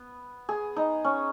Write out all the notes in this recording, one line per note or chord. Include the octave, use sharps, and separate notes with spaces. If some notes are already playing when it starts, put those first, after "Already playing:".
Already playing: B3
G#4
D#4
C#4